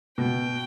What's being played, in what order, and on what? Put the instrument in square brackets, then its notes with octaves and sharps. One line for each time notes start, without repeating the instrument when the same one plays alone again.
[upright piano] B2 [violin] G5